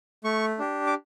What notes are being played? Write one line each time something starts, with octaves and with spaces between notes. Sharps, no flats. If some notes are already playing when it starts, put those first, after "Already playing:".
A3 C#6
D4 G4
D6